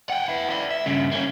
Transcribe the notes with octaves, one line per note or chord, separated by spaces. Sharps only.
F#5 G5
B3 E4
D5 E5
E5
G2 C#3
A#3 C#4